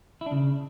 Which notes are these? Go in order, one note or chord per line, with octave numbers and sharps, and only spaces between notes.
E4
D4
C#3